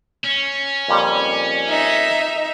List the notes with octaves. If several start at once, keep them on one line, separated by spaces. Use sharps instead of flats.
C#4
F2 A#2 G3
D#4 E5